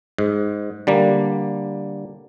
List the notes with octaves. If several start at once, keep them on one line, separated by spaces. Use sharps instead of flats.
G#2
D3 G3 A#3